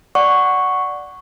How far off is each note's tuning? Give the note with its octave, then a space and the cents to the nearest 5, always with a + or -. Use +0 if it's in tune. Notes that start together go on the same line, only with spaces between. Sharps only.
D5 +0 F#5 +0 C#6 +0